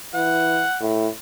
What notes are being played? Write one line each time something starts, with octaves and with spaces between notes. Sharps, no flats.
E3 F#5
A2